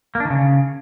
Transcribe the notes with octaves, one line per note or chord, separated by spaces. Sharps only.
A#3
D4
D#3
C#3